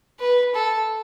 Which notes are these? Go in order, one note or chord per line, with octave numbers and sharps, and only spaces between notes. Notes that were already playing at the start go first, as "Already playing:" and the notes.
B4
A4